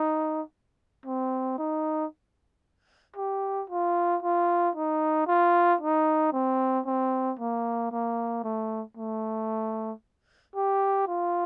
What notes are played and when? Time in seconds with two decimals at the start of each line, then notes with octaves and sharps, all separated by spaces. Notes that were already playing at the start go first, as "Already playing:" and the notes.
Already playing: D#4
1.06 C4
1.58 D#4
3.16 G4
3.70 F4
4.22 F4
4.75 D#4
5.27 F4
5.81 D#4
6.33 C4
6.86 C4
7.39 A#3
7.92 A#3
8.44 A3
8.97 A3
10.56 G4
11.08 F4